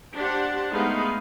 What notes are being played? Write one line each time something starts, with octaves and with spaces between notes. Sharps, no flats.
D4 G4 C5 F#5
G#3 A3 B3 D#4 F5